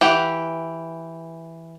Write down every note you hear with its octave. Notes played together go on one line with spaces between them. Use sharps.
E3 G4 F#5